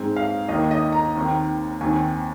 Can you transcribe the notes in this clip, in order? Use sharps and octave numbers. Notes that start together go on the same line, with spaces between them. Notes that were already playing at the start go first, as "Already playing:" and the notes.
Already playing: G#2 G#3 C4
F5
D#2 D#3 A#3 D#5
D#5
A#5
D#2 D#3 C4
D#2 D#3 C4 G#5